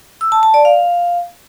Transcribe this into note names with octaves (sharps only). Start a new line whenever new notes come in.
E6
A5
A5
D5
F5